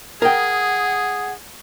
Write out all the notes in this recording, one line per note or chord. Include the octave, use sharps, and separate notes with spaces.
G#4 A#4 F#5 G5 D#6